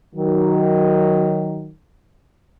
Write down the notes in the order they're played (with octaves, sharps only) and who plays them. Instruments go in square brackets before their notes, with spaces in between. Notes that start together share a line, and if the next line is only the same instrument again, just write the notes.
[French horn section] D#3 F#3